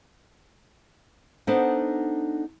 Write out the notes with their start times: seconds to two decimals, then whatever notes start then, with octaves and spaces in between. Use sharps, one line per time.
1.47 B3 D4 D#4 A4 C5 F#5